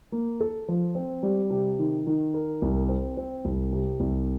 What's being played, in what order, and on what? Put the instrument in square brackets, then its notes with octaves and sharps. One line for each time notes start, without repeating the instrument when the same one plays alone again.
[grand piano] A#3
A4
F3
C4
G3
C3
D#3
D#3
A#4
C2
C4
C4
C2
C3
C2